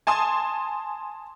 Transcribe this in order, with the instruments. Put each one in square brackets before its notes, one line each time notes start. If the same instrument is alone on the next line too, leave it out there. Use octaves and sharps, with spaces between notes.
[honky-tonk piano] G#5 A5 C6 D#6